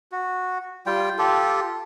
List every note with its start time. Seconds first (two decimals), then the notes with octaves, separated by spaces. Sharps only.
0.12 F#4
0.86 G3 F4 G5
1.18 F4 G4 A4